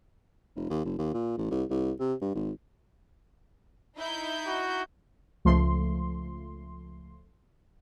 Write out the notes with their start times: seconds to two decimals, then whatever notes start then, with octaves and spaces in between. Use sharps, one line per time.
0.56 F1
0.70 D#2
0.85 F#1
0.98 D#2
1.14 A#2
1.38 A1
1.51 C2
1.70 C2
2.00 C3
2.21 G2
2.35 G#1
3.97 D#4 E4 G6
4.47 F#4
5.45 C#2 F3 A3 C6